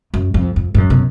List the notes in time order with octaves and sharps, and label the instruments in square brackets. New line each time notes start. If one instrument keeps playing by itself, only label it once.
[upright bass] F#2
F2
F2
G#2
F#2
B2